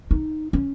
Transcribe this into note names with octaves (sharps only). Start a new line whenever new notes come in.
D#4
C#4